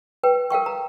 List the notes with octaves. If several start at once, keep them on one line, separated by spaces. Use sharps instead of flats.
B4 G5
A#4 F5 G5 C#6
A#5